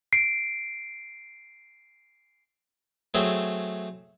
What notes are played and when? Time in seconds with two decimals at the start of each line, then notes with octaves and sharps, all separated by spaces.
0.13 C7 D7
3.14 F#3 A3 C4 G#4